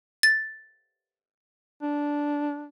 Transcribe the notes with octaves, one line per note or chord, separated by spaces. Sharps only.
A6
D4